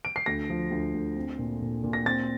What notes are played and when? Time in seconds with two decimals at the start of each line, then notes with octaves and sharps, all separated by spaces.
0.05 D7
0.16 C7
0.26 D2 A#6
0.50 F3
0.71 D2
0.94 D2
1.16 C4
1.39 A#2
1.62 A#2
1.84 A#2
1.93 A#6
2.06 C4 A6